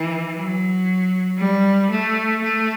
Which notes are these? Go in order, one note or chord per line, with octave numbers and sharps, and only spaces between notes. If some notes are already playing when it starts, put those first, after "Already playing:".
Already playing: E3
F#3
G3
A3
A3